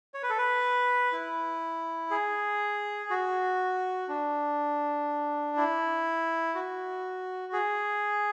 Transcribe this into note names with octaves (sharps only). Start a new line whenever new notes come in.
C#5
B4
A4
B4
E4
G#4
F#4
D4
E4
F#4
G#4